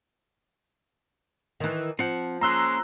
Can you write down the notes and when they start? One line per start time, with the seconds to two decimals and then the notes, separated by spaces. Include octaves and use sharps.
1.60 D#3 E3
1.99 F3 C4 F#5
2.41 G#3 A#3 C#4 F4 A#5 C6 E6 F#6